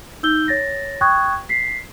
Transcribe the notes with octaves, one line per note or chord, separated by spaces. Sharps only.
D#4 E6 G6 G7
C#5 A6 A#6
G5 C#6 D#6 F#6 G#6
B6 C7